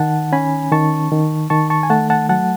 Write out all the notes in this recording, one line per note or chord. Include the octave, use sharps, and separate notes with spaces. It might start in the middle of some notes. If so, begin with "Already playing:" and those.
Already playing: D#3 F#5 A5
C#4 G#5 B5
D#3 A5 C#6
D#3
D#3 A5 C#6
A5 C#6
G#5
A3 F#5 A5
F#5 A5
F#3 F#5 A5